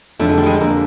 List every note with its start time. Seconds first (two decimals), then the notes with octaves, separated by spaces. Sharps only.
0.19 F1 F2 D3 A3
0.29 G#3
0.37 G3
0.46 G#3
0.60 F2 D3 A#3